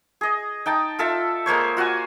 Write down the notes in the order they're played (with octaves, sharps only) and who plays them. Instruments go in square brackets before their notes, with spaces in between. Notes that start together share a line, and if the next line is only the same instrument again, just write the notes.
[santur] G#4 D#5
D#4 G5 A5
F4 A4 E5 A5
G#3 A#3 C5 C#5
F4 F#4 F#5 G#5